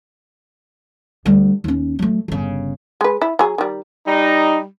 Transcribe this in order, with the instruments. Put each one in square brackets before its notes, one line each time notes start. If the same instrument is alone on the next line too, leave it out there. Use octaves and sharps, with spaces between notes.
[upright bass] D2 G3
D#2 C#4
F#3 A3
G1 C#3
[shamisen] G#3 B4
E4
F#3 G#4
D#3 G3
[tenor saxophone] G3 [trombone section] D#4